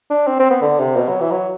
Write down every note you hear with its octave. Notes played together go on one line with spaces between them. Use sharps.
D4
C4
C4
B3
D3
C3
B2
F#3
E3
F#3